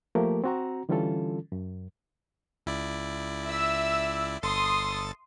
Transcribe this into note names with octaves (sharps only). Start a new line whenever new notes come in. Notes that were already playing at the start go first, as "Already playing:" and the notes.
F3 A3 A#3 G4 A#4
C4 F#4 A#5
D3 E3 G3 C#4 F4 A4
F#2
C#2 E4 D5
E5 E6
G1 A4 C6 D#6 A6